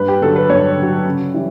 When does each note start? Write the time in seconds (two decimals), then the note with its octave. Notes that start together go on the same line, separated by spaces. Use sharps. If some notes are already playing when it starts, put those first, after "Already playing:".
Already playing: G2 B4
0.08 G4
0.22 D3 F#3 A4
0.36 B4
0.49 G2 C#5
0.78 D3 F#3
1.05 C#3
1.34 E3 G3